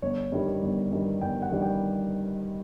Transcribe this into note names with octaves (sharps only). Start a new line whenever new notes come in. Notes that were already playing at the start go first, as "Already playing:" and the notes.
G1 C#5
G2 D#3 G3
G1
G2 D#3 G3
G1 G5
F#5
G2 D#3 G3
G5